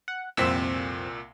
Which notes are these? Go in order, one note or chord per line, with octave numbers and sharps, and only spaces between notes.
F#5
C2 F2 A#2 C4 E6 B6